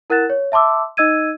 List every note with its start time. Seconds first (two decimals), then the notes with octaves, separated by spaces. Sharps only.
0.10 E4 A#4 F#5 F#6 A6 E7
0.30 C#5
0.52 E5 A5 C6 D6 E6
0.97 D#4 D#5 E6 G#6 D#7